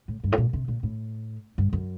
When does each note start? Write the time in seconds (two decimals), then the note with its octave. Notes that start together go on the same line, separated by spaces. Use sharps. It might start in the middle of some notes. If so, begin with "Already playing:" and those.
0.08 A2
0.24 G2
0.32 A2
0.38 A#2
0.53 C3
0.68 A#2
0.83 A2
1.58 G2
1.73 F#2